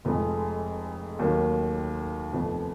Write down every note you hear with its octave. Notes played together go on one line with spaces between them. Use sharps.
F1 F2 F3 G#3
D#2 D#3 F#3 A#3
F1 F2 F3 B3